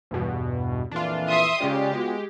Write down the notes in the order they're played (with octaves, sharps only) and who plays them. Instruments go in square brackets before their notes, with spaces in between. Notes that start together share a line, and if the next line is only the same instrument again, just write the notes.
[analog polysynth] E2 G2 B2
[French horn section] F2 A#2 E3 [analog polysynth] D4 F4
[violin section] E5 C6 D#6
[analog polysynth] C#3 G#3 F4 [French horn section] C#4 D5 [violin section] G4
[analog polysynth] G#3 [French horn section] B3 F4 F#4